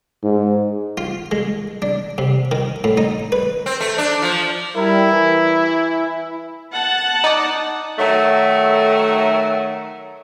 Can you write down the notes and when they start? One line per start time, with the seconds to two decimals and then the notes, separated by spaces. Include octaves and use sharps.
0.23 G#2
0.97 F4
1.31 G#3
1.82 D4
2.18 C3
2.51 D#3
2.84 A2
2.97 D#4
3.32 B4
3.66 C4
3.81 A3
3.98 D4
4.22 F3
4.76 G3 E4 A#4
5.10 E3
6.74 F#5 A5
7.24 D#4 D5
7.98 D#3 F#3 A3